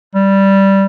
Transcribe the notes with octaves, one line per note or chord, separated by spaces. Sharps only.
G3